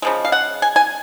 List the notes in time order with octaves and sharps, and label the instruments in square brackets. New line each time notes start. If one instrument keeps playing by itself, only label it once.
[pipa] C#3 F3 G#3
F5
F#5
G#5
G#5